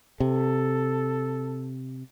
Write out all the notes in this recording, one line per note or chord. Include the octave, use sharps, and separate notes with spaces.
C3 A4